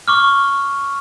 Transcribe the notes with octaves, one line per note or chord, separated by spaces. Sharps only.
C#6 D6 F6